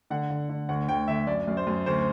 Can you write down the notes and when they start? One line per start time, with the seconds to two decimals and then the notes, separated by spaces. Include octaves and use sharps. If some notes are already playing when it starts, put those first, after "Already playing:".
0.10 D3 F#5
0.30 D3
0.49 D3
0.69 D2 F#5
0.88 D2 G5
1.08 D2 E5
1.27 F#2 D5
1.47 F#2
1.57 C5
1.67 F#2
1.86 D2 C5